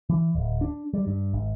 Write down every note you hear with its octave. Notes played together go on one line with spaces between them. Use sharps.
E3
D1
D4
G3
G2
G#1